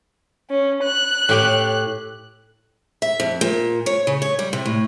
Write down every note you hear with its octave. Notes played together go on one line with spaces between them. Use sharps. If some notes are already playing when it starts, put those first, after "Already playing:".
C#4
F#6
A2 G4 G5
E5
F2
A#2
C#5
C#3
C#5
G3
C3
A2